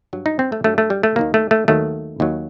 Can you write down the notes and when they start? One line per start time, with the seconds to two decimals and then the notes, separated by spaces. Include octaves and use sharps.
0.13 G2 F#3
0.26 D#4
0.39 C4
0.52 A3
0.64 G2 F#3 A3
0.78 A3
0.90 G3
1.03 A3
1.16 D#2 D#3 F#3 A#3
1.34 A3
1.51 A3
1.68 D#2 D#3 F#3 A3
2.20 D#2 D#3 F#3